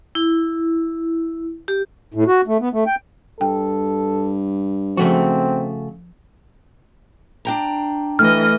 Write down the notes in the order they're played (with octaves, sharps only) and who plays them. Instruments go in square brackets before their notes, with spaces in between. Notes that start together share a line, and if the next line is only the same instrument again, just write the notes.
[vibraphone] E4
G4
[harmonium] A2
F#4
A3
B3
A3
G5
[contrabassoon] G2 [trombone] A4 [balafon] G5
[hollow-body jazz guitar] C#3 A3 F#4 [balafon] F3 [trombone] C4
[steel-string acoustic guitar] D4 G5 A#5
[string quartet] E3 D#5 [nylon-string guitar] A3 [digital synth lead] F6